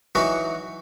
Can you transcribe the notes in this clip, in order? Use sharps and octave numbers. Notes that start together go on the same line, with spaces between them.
E3 F#3 D#4 F#4